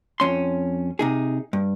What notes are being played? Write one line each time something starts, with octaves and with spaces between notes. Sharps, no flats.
F2 C#4 C6
C3 D#4 G#4
G2